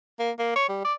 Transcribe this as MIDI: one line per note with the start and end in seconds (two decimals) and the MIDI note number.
0.19 0.31 58
0.39 0.55 58
0.55 0.68 73
0.69 0.81 55
0.84 0.93 74